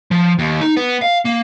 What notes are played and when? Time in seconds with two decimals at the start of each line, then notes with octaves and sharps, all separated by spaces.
0.11 F3
0.39 D#2
0.61 D#4
0.76 B3
1.01 F5
1.25 A#3